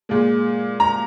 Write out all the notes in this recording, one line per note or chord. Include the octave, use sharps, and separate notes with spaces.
A#2 G#3
A#5